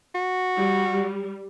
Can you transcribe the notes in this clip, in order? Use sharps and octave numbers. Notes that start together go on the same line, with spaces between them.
F#4
G3